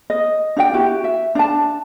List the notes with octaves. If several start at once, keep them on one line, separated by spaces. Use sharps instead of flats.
D#5
D4 F#4 E5 G5
E4 F#4 G4
E5
D4 A5